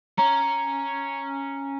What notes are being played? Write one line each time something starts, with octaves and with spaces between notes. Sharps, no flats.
C#4 A#5